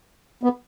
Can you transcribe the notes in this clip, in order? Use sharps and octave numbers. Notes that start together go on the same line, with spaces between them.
B3